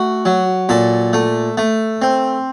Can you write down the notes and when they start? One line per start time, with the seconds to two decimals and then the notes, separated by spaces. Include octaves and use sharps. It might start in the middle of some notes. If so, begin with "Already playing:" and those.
Already playing: A3 F#4
0.25 F#3
0.69 A#2 A4
1.13 A3
1.57 A3
2.02 C4